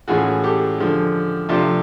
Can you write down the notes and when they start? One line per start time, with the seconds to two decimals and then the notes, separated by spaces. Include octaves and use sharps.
0.08 A2 E3 G#3 C#4 F4 F#4 G#4
0.43 G4 A4
0.78 D3 F3 G#3
1.49 C3 F3 A3 D4 F4 G4 A4